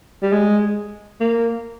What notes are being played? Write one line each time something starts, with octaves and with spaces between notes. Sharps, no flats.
G3
G#3
A#3